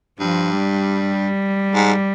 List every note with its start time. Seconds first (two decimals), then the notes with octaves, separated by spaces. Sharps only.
0.19 G2 F3
0.58 G3
1.74 G#2